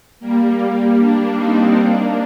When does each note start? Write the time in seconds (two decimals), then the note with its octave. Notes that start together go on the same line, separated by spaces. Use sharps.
0.20 G3 A#3
0.98 A#3 D4
1.37 C4 D#4
1.75 A#3 D4